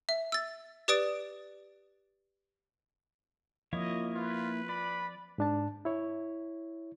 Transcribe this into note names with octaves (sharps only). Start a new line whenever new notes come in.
E5
E6 A6
G4 B4 D5 D#6 A6 D7
F3 A#3 E4 C#5 D#5
F4 B4
D5 B5
G#2 D4 A5
E4 C#5